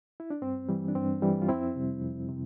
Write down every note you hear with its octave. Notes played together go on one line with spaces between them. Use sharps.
E4
D4
G2 C4
E3 G3
D4
G2 C4
E3 G3
F4
F2 C4 E4
C3 G3
F2
C3